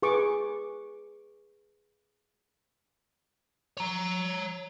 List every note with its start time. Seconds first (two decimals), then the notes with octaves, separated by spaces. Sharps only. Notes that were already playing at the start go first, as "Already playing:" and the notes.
0.02 G#4 B4 C#6 D6
3.77 C#5 A#5